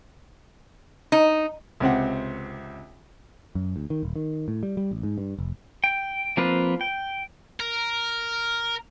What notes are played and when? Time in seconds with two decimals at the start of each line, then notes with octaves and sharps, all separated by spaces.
1.12 D#4
1.80 C#2 C3 C4 F#5
3.55 F#2
3.76 D2
3.90 D#3
4.03 D#1
4.16 D#3
4.48 A2
4.63 G3
4.77 G3
4.91 A1
5.03 G#2
5.18 G2
5.38 F1
5.84 G5
6.37 F3 A#3 C4 F4 B4
6.81 G5
7.60 A#4